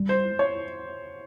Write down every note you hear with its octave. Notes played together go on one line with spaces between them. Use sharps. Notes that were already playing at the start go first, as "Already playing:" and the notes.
Already playing: G3
C5
C#5